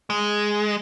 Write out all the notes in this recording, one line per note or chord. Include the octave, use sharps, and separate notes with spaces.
G#3